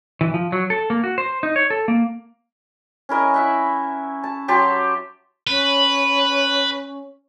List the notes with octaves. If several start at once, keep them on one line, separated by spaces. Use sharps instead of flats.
E3
F3
F#3
A4
A#3
F#4
C5
D#4
C#5
A4
A#3
C#4 E4 A#4 D#5
E4 E5 F#5
A5
F#3 G4 A5 C6
C#4 B4